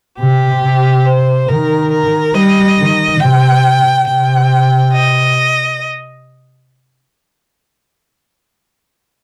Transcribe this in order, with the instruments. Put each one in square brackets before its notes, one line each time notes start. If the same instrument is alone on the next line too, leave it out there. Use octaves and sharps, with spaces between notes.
[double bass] C3 [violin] G4
[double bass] C3
[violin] C5
[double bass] D#3 [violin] A#4
[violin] A#4
[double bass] G3 [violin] D#5
[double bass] D#3
[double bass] C3 [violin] G5
[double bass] C3 [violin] G5
[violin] D#5